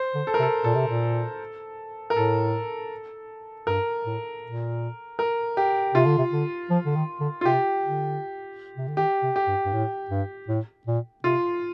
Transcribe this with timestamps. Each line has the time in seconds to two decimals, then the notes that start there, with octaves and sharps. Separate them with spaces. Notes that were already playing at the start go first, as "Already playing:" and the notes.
Already playing: C5
0.14 D3
0.27 A4
0.34 A#4
0.39 C3
0.42 A4
0.64 A#2 A4
0.75 C3
0.87 A#2
2.10 A#4
2.15 A2 A4
3.67 G2 A#4
4.06 A2
4.44 A#2
5.19 A#4
5.57 G4
5.95 C3 F4
6.06 D3
6.18 C3
6.32 D3
6.70 F3
6.85 D3
6.96 D#3
7.20 D3
7.41 F4
7.45 C3 G4
7.84 D3
8.77 C3
8.88 D3
8.97 D#3 G4
9.23 C3
9.36 G4
9.47 G2
9.65 G2
9.73 A2
10.10 G2
10.48 A2
10.87 A#2
11.24 C3 F4